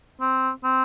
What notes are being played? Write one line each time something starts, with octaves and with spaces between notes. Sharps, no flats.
C4
C4